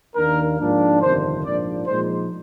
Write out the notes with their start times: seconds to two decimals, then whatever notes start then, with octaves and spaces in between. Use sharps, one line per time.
0.15 D#2 D#3 A#3 D4 A#4
0.59 G#2 F3 A#3 D4
1.01 G1 F2 C3 D#3 C5
1.44 A#1 G#2 F3 A#3 D4 D5
1.87 A#2 F3 G#3 D#4 C5